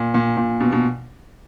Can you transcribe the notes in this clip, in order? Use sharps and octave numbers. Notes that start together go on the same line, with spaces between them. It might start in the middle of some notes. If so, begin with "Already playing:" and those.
Already playing: A#2
A#2
A#2
B2
B2